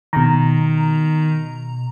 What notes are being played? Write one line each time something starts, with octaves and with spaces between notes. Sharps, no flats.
B2 D#3 A#5